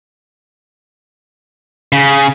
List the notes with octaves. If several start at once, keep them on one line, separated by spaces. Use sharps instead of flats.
C#3